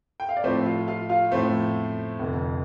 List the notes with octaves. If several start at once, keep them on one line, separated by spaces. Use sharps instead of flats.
G5
F5
D5
A2 F3 A3 C4 C5
F4 F5
F4 F5
F4 F5
A2 F3 A3 C4 C5
F1 F2 D3